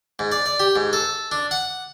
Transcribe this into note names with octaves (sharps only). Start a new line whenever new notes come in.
G#2
D5
D5
G4
G#2
A4
D4
F#5